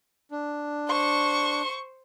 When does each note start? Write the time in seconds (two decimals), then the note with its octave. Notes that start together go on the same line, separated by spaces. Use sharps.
0.31 D4
0.89 C5 C#6 C#7